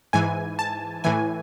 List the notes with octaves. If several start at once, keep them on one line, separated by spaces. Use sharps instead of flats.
G#2 E3 G#5
A5
A2 E3 G#5